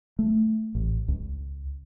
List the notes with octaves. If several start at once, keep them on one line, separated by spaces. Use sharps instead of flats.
A3
A1
C#2